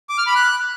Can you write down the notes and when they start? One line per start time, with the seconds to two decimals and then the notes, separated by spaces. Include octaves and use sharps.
0.09 D6
0.18 F6
0.27 B5
0.35 F#6